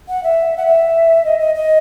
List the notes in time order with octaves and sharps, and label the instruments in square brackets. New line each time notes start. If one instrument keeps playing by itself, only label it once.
[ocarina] F#5
E5
F#5
E5
D#5
D#5
D#5